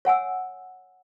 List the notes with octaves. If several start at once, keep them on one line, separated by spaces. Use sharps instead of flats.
C#5 F#5 G#5 E6